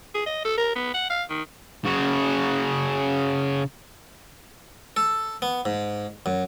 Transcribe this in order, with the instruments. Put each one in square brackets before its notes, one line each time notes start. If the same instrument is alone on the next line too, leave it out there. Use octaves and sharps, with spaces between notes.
[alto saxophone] G#4
D#5
A4
A#4
B3
F#5
F5
D#3
[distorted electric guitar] C#3 F#4
[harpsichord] A4
B3
G#2
F#2